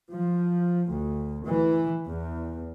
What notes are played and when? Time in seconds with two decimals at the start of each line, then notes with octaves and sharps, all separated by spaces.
0.11 F3
0.89 D2
1.47 E3
2.06 E2